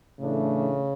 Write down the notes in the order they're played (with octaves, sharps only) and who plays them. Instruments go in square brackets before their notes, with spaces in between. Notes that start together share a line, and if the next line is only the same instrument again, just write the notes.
[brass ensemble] A2 E3 A3 D4 [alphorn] C#3